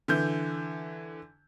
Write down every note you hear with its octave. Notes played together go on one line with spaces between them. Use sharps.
D3 E3 G6